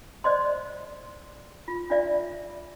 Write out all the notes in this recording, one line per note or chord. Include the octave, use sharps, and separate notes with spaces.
C5 D5 D#5 C6
F4
D4 F4 D5 E5